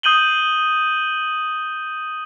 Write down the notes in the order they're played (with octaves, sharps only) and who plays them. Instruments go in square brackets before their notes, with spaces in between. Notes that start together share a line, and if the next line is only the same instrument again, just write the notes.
[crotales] D#6 G6 D#7 F#7 G7